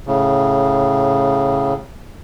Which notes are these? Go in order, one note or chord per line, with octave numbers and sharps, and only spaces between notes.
A2 C#3